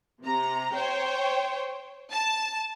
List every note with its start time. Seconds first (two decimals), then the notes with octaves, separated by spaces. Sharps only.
0.22 C3 A#5
0.74 C5 C#5 G5
2.12 A5